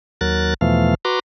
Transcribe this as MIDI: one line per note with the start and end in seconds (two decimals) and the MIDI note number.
0.21 0.54 39
0.21 0.54 54
0.21 0.54 70
0.21 0.54 90
0.21 0.54 93
0.61 0.95 40
0.61 0.95 47
0.61 0.95 52
0.61 0.95 53
0.61 0.95 57
0.61 0.95 77
1.05 1.19 66
1.05 1.19 71
1.05 1.19 82
1.05 1.19 84
1.05 1.19 86